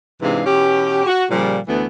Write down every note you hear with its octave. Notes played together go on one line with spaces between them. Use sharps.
G#2 C3 E3 G#3 D4 F5
B2 E3 C#4 G4
F#4
A#2 C#3 F3 G3
D2 E3 A3 B3